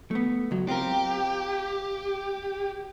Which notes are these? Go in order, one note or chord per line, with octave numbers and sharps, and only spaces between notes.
A3 B3
C#2 F#3
C4 F4 G4 A#4